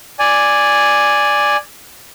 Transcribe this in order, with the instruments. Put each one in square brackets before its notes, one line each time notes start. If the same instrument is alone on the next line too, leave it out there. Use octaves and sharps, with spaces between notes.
[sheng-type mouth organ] D5 G#5